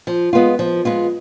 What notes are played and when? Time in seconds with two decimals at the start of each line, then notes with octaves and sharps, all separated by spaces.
0.07 F3
0.33 G#3 B3 F4
0.59 F3
0.85 G#3 B3 F4